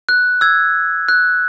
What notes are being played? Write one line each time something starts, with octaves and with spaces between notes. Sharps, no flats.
F#6
E6 G#6
F#6